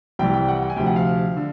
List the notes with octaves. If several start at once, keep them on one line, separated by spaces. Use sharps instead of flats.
C2 C3 E3 G3 G5
G5
F#5
G5
G#5
D2 C3 F3 G5
F#5
F5
D3